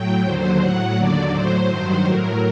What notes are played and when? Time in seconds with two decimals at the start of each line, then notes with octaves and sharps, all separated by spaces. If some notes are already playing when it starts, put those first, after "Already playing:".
Already playing: A2 F#3 G5
0.24 D#2 D3 F#3 C5
0.59 A2 F#3 F#5
0.95 D#2 D3 F#3 D5
1.31 A2 F#3 C5
1.67 G2 D#3 F#3
2.03 A2 F#3 A#4